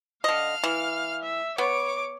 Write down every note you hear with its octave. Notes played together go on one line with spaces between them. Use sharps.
D3 D#5 F5 F6
E3
E5
B3 C#5 D6